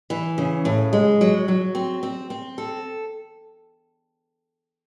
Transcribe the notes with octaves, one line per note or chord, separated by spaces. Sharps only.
E3
C#3
A2
G#3
F#3
F#3
C4
C4
C4
A4